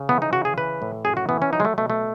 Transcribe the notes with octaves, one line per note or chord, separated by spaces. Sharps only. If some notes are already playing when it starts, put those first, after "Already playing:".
Already playing: C#3
E3 B3
D#4
C#3 F#4
G#4
E3 B4
A2
F#2 G#4
F#4
E3 B3
C#4
F#3 D#4
G#3
A3
B2 A3
A3